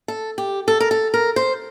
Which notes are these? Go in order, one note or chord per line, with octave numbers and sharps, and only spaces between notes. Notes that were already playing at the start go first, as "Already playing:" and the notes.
A4
G4
A4
A#4
A4
A#4
C5